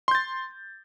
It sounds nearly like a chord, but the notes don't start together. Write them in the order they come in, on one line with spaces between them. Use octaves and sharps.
C6 G6 A6